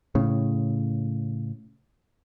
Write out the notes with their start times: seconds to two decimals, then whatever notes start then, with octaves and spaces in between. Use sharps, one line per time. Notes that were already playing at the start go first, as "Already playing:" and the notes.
0.15 A2 C#3